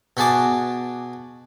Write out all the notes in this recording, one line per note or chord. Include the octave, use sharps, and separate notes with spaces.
B2 F#4 G#4 A5 D6